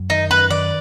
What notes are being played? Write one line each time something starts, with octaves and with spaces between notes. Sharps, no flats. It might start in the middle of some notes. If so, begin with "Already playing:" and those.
Already playing: F#2
D#3 D#4
F#2 B4
D#3 D5